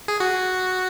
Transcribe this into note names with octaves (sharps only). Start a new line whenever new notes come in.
G#4
F#4